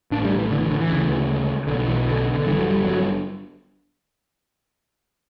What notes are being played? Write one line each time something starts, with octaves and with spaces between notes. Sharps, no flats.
A1 A2 D4
G3
E3
D3
E3
D3
E3
D2 C#3
B1 B2 D3
E3
D3
D3
G1 G2 D3 E3
F#3
G3
F#3